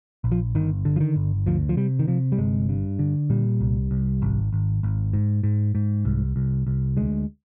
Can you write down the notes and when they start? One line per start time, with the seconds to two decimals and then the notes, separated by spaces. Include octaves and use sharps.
0.24 A#1
0.32 F3
0.55 G1 D#3
0.85 D3
0.96 F3
1.00 D#3
1.16 G1
1.46 D2 F3
1.69 F3
1.77 C3 G3
1.99 D#3
2.08 C3 F3
2.32 G3
2.38 G1 G#3
2.69 G2
2.99 D3
3.30 A#2 G3
3.60 C2
3.91 C2
4.22 G#1
4.53 G#1
4.83 G#1
5.13 G#2
5.43 G#2
5.75 G#2
6.05 C2
6.36 C2
6.67 C2
6.97 D2 G#3